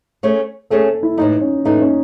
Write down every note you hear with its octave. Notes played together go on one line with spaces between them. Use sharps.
A3 C#4 G#4 C#5
A3 C#4 G#4 A4 C#5
E4
A2 E3 A3 D#4
C#4
A2 E3 A3 D#4
C#4